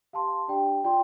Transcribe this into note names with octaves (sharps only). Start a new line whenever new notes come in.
G4 F5 A5 C6
D4 G4 D5 G5
F4 D5 G5 C6